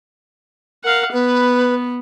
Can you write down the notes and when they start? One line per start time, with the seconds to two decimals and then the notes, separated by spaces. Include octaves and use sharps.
0.84 A#4 F5 F#5
1.12 B3 B4